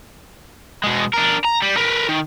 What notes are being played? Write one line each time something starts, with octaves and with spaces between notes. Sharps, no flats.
B2 G#3
D4 A#4
A#5
G3
A#4 B4
D#3